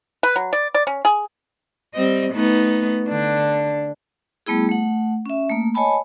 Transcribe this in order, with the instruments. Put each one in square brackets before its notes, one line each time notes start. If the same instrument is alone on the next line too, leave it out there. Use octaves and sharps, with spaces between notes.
[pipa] B4
F#3
D5
D5
C#4
G#4
[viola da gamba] G3 C4 D#5
A3 B3 D#4
D3 D4
[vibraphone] G3 A3 B3 E4 G#4
A3 F#5
C#4 E5
A3 A#3
C#5 D#5 G#5 A5 B5